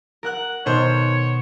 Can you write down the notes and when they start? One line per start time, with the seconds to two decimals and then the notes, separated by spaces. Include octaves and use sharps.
0.23 A#4 F#5 F#6
0.66 B2 D#3 C5 C#5